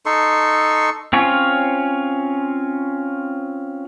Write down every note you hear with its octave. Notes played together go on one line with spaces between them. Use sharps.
D#4 A4 C6 C#6
C4 C#4 F4 C#5